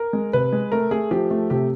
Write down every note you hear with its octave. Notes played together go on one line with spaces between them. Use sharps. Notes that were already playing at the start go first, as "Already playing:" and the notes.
Already playing: A#4
G#3
C3 B4
G#3
A3 A#4
A3 G#4
F3 G4
A3
C3 G4